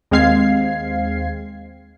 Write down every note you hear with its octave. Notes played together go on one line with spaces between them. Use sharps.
D#2 G#3 C4 F5 G#6 C7